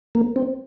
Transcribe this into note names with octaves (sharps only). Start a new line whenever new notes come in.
A#3
C4